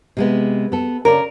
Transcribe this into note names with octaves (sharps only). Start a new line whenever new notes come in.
C3 G#3 B3
B3 A4
C#3 A#4 C#5 D5